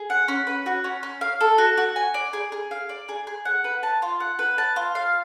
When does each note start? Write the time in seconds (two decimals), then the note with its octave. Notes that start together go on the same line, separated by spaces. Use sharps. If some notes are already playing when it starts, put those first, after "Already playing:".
Already playing: G#4
0.10 F#5
0.28 C#4
0.47 B4
0.66 F#4
0.84 C#4
1.03 C#4
1.21 F5
1.41 A4
1.58 F#4
1.78 F#4
1.96 G#5
2.14 D5
2.33 G#4
2.52 G#4
2.71 F5
2.89 D5
3.09 G#4
3.27 G#4
3.45 F#5
3.64 B4
3.83 A5
4.02 F4
4.20 F#5
4.39 B4
4.58 A5
4.76 F4
4.95 F5